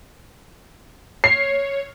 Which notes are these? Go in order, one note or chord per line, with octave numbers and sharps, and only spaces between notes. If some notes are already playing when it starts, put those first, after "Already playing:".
C#5 C7